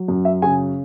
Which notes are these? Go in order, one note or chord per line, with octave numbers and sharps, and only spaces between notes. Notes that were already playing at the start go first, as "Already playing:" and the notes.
Already playing: F#3
F#2
E5
C#3 G#5